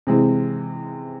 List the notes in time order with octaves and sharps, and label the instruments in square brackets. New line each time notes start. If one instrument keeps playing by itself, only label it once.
[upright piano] C3 E3 G#3 C4